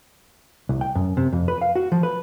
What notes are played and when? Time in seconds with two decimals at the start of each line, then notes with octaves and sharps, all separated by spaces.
0.69 C2
0.81 G5
0.95 F#2
1.17 C3
1.32 F2
1.48 B4
1.62 F5
1.76 F#4
1.92 F3
2.03 B4